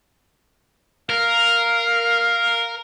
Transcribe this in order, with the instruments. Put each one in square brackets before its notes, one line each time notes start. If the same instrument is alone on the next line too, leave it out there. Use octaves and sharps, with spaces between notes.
[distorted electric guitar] A#4 [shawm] F5